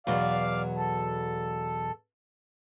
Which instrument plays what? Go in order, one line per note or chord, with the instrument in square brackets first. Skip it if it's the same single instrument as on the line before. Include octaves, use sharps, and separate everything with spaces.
[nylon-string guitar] E2 B2 F#3 [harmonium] D5 F5
[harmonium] A4